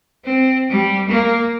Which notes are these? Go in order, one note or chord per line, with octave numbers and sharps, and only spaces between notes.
C4
G3
A#3